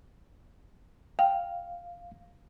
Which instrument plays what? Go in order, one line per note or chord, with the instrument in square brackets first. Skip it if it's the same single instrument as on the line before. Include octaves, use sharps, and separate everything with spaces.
[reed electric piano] F5 [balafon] G5